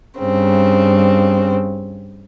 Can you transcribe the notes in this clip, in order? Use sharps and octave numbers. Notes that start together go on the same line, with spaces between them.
G2 C#3 C4